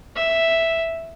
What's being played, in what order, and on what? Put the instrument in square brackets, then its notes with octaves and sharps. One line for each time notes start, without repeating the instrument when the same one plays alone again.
[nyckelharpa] E5